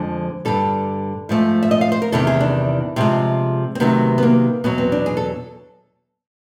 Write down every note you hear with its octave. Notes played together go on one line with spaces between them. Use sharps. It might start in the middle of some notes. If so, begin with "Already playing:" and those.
Already playing: F2 D3 F3 G#3
G2 D3 G3 A4
G#2 F3 A3
E5
D#5
F5
C5
A#4
E2 C3 D#3 A4
G#4
D4
C3 F3 G#3 C4
C4
C3 D#3 F#3 A3 B3
B3
A#3
E2 B2 F#3 B3
C4
D4
G#4
A4